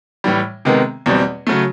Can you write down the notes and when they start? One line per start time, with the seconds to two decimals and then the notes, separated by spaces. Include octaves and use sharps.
0.24 A2 E3 G3
0.65 C3 D#3 G#3 B3
1.06 E2 B2 G3 C4
1.47 C#3 F#3 A3